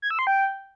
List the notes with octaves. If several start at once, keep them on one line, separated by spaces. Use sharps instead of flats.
G#6
E6
C6
G5